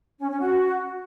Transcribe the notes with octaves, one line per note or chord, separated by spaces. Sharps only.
C#4
C#4
F#4